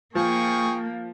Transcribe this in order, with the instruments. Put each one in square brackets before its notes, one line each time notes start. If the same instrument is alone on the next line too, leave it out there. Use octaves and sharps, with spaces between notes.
[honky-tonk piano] F3 [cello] A#3 [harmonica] G#4 G5 C#6